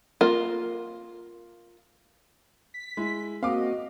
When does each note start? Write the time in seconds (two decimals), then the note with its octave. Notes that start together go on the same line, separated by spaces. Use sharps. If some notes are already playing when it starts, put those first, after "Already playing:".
0.21 A#3 F4 A#4
2.74 B6
2.97 G#3 E4
3.43 A#3 C4 F#4 D#5 F5 D6